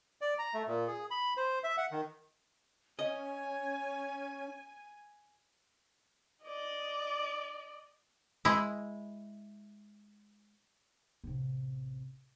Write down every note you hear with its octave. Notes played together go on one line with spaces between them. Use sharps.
D5
A#5
A3
A#2
G#4
B5
C5
E5
F#5
D#3
C#4 C#5 D#5 G#5
D5 D#5
G#3 E4
A1 C3